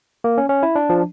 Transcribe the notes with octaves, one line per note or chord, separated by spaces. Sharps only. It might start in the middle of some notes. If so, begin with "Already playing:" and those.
A#3
C#4
C#4
E4
D4
F3